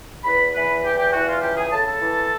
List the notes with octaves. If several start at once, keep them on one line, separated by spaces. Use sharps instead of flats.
E2 B4 B5
E3 B4 B5
E2 G4 G5
G4 G5
E3 F#4 F#5
F4 F5
C#2 G4 G5
G#4 G#5
C#3 A4 A5
A4 A5
E3